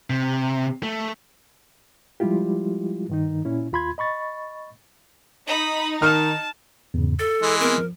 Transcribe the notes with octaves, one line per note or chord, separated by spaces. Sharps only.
C3
A3
F3 G3 G#3 E4 F4 G4
G2 D#3 D#4
A#2 C#4 E4
D#2 F4 B5 C6 G#6
D#5 B5 C#6 A6
D#4 B5 D#6
D#3 A5 F6
E2 G#2 C#3
A4 A6
E3 G#3
B3 C4 A#4
F3